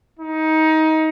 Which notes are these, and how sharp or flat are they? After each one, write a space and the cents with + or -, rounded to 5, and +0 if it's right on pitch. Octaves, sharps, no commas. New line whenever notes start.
D#4 +20